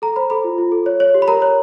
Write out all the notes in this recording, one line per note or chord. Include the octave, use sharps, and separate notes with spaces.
A4 A#5
C5 B5
A4 B5
F4
F4
A4
C#5
C#5
G4
B5
A#4 A#5
C#5